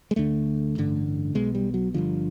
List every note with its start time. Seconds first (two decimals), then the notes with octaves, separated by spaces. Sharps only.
0.11 G#3
0.16 D2 D3 A3
0.76 A1 G2 D3
1.35 B1 B2 G#3
1.55 G3
1.74 F#3
1.94 G1 G2 D3 F3